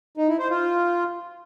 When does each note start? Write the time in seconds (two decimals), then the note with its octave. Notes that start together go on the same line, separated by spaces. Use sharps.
0.17 D#4
0.28 E4
0.39 C5
0.50 F4